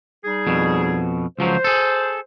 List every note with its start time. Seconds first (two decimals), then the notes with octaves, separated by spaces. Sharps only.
0.24 G3 D#4 G#4
0.47 F2 B2
1.39 C#2 F3 F#3 C5
1.64 G#4 A4